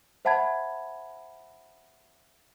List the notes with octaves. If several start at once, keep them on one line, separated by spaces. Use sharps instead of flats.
C5 E5 F#5 A5 B5 G#6